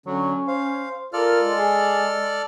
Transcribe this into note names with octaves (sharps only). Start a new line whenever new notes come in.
D3 F#3 C#4
C5 F5
F4 A4 A#4 D5 F6
G#3
G#4